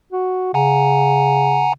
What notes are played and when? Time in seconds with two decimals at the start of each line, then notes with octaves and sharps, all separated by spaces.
0.13 F#4
0.54 C#3 F#5 G#5 A#5